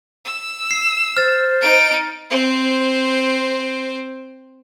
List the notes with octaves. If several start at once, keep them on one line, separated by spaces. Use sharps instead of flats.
E6
C7
C5 F6 A6
D#4 D7
C4 C5